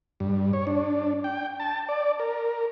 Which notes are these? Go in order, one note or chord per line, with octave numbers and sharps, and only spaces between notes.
G2
C#5
D4
G5
A5
D5
A#4